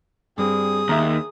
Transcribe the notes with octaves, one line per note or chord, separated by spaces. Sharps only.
G2 G3 C4 G#4 D#6
D#2 E5 A#5